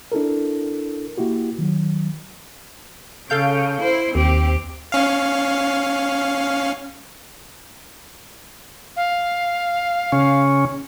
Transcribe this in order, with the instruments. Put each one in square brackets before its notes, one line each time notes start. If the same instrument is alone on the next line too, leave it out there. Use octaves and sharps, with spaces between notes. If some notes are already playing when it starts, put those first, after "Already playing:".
[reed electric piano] D4 E4 A4 A#4
A#3 E4 F#4 G4
D#3 F#3
[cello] C#3 [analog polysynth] A4 F5 G6
[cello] E4 C5
[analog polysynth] D#2 [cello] C4 G4
[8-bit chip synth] C#4 F5
[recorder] F5
[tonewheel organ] C#3 C#4